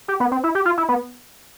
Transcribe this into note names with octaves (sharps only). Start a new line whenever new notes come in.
G4
B3
C4
E4
G4
F4
E4
B3